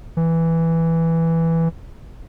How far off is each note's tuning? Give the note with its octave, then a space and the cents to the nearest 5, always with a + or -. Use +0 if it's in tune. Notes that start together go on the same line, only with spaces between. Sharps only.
E3 +0